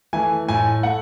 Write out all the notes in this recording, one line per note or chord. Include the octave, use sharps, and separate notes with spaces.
E3 A3 G#5
A2 G#5
A3 F#5